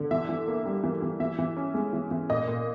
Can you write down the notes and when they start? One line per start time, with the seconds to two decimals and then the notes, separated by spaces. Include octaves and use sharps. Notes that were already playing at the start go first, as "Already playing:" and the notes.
Already playing: D3
0.11 E3 E5
0.29 E3
0.47 A#3
0.65 G3
0.83 E3
1.02 E3
1.20 E3 E5
1.38 E3
1.56 C#4
1.74 G#3
1.93 E3
2.11 E3
2.29 A#2 D#5
2.47 A#2